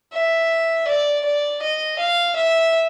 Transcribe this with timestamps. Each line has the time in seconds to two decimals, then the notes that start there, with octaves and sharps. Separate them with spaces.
0.13 E5
0.88 D5
1.25 D5
1.62 D#5
1.99 F5
2.36 E5